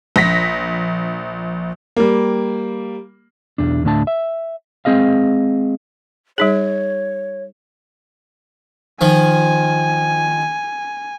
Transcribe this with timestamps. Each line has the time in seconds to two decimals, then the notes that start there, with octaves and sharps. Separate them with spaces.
0.16 A#1 A#6 B6
1.96 G3 A#3
3.58 B1 E2 D4
3.84 D2 A2 D4 A5
4.07 E5
4.85 G#3 C4 G#4 D#5 F5
6.38 G3 D#4 G#4 C#5
9.01 D#3 F3 G#5